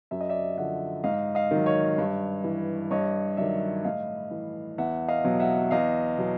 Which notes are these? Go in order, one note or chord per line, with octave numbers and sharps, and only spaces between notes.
F#2 E5
D#5
D5 E5
D3 F3 E5 F#5
G#2 D#5 F5
D#5 F5
D#3 F#3
C#5 D#5
G2
E3
G2 C#5 D#5
D#3 F#3 D5 E5
A2 D#5 F5
E3
E2 E5 F#5
D#5 F5
B2 F#3
E5 F#5
E2 D#5 F5
B2 F#3